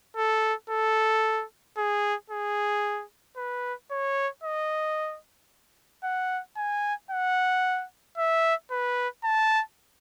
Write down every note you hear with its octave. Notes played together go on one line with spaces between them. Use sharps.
A4
A4
G#4
G#4
B4
C#5
D#5
F#5
G#5
F#5
E5
B4
A5